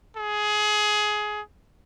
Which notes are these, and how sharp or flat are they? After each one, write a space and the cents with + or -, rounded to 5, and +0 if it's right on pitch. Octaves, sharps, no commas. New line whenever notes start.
G#4 +20